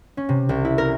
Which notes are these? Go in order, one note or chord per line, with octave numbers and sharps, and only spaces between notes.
C#4
C3
C2
E4
A#4